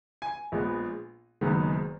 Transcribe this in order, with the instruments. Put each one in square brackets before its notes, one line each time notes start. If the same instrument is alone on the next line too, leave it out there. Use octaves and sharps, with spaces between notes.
[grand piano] G#5
A#1 A#2 G#3 B3
F#1 F#2 D#3 G#3 B3